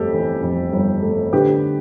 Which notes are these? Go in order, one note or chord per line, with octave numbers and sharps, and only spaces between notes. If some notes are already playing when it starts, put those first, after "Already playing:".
Already playing: G1 F2 A3 G4 A4
E3
F2
G1
A3
D3 G4 B4